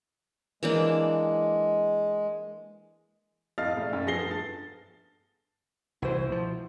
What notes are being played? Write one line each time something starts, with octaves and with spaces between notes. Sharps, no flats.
E3 G#3 A#3 D4
F2 A2 D#5 F5 F6 A6
E1 A3
F#2 A3
F3 B3 G#4 A#6 C7 G7
G2 A4
A6
C2 E3 E4 F#4 C5
B2 E3 F3